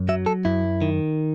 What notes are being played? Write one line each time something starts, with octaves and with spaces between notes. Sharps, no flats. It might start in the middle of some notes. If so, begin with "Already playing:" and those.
Already playing: F#2
F#3 E5
A4
F#2 E4
D#3